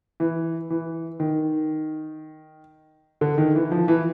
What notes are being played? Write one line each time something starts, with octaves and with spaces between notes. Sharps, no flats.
E3
E3
D#3
D3
D#3
E3
F3
E3